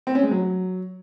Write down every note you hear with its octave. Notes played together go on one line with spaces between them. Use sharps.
C4
C#4
G#3
F#3